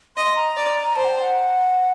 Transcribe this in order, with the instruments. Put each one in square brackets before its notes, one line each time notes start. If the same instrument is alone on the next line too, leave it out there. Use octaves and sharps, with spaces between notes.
[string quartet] D#5 [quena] C6
[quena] A#5
[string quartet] D5
[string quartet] C5 [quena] A5
[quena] F#5
G5
F#5